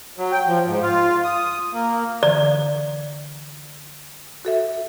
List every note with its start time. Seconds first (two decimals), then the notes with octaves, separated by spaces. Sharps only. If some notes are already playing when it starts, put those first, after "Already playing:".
0.18 F#3
0.32 G5
0.47 F3
0.66 G#2
0.82 F4
1.24 D#6
1.73 A#3
2.23 D3 E3 D5
4.45 F#4 A4 E5